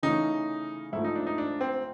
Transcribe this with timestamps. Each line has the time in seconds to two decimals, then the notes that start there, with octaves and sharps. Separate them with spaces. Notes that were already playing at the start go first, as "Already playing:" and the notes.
0.03 C#3 E3 A3 C#4 D#4
0.93 G#2 F3 A3 E4
1.04 D#4
1.15 D4
1.27 D#4
1.38 D4
1.61 C4